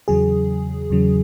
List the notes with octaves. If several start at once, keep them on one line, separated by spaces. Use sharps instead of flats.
E2 C#3 F#3 G#4
E2 C#3 F#3